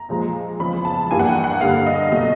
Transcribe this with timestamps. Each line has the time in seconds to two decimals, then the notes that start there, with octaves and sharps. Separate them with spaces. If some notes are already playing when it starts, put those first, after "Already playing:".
Already playing: A#5
0.09 A#2 F3 G#3
0.59 E2 C#3 F3 G#3 B5
0.85 A5
1.11 G2 E3 G3 A#3 G#5
1.19 F#5
1.27 G5
1.44 F#5
1.61 G2 D3 G3 A#3 F5
1.86 D#5
2.12 B2 F#3 A3 D#5